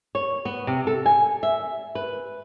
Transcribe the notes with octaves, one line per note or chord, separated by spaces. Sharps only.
C#5
B3
C3
A4
G#5
E5
B4